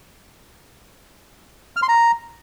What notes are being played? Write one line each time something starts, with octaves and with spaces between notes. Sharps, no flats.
F6
C6
A#5